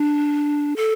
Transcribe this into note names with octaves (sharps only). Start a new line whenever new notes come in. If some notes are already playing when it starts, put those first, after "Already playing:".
Already playing: D4
A4